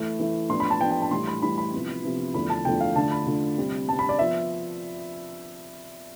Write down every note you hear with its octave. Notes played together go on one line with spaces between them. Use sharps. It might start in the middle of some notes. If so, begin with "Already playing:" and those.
Already playing: E3 A3 E4
E3 A3 E4
A2 F3 B3 D4 C6
B5
A5
A2 F3 B3 D4 G5
G5
A5
A2 E3 G3 C6
B5
A2 E3 G3 B5
B5
C3 F3 B3 E4
C3 F3 B3 E4
E2 D3 F3 A3 E4 B5
A5
E2 D3 F3 A3 E4 G5
F5
D3 A3 D4 F4 A5
B5
D3 A3 D4 F4
C3 G3 C4
C3 G3 C4 A5
B5
D5
F3 B3 E5